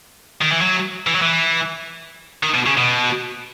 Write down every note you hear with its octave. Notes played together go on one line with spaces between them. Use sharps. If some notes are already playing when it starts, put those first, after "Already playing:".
D#3
E3
F#3
E3
F#3
E3
D#3
B2
C#3
B2